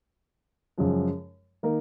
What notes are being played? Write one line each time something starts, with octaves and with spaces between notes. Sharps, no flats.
F#2 C#3 F3 G#3
D#3 A#3 D#4 A#4